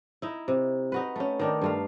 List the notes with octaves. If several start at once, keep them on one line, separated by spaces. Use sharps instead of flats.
D#4 E4
C3
D#4 F#4 B4
A3 C#4
D#3 D4 D#4
G2 A3 F5